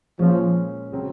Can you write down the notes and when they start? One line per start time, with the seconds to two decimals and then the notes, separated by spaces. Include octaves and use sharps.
0.19 A#2 F3 G#3 C#4
0.92 C#3 F#3 C4